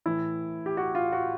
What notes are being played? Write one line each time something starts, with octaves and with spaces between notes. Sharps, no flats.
A2 E3 E4
G4
F#4
F4
F#4